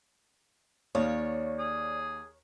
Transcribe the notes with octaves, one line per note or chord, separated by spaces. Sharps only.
D#2 C#5 D5 F5 D#6
G#4